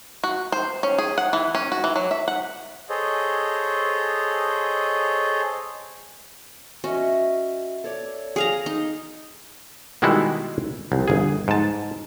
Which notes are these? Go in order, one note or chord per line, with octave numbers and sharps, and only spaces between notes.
F#4
C5
C#4
G#4
F#5
E3
C#4
F#4
E3
F#3
E5
F#5
G#4 A4 C5 C#5 D#5
C#4 F#4 D#5 E5
A4 C#5 D5
G#4 F5 A#5
D#4
B2 D#3 G3 G#3 E4 F#4
C2
G1 G#4
G#2 A5